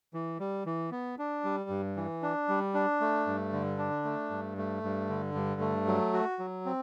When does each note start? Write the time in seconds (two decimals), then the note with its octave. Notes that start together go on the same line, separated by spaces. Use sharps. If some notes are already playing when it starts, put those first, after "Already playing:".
0.14 E3
0.40 G3
0.66 E3
0.91 B3
1.19 D4
1.44 G3
1.70 G2
1.96 E3
2.22 D4
2.49 G3
2.74 D4
3.00 A3
3.27 G2
3.53 D3
3.78 D4
4.04 A3
4.30 G2
4.57 A3
4.83 G2
5.09 D3
5.34 G2
5.61 A3
5.87 F#3
6.14 F#4
6.39 F#3
6.65 C4